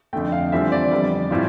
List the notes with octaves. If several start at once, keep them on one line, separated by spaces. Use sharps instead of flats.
F2 D3 A3 G5
F5
E2 D3 G3 C4 F4 E5
D5
F2 D3 G3 B3
A2 G3 C4 F4